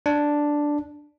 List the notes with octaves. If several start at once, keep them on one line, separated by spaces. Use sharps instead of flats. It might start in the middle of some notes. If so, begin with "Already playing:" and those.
D4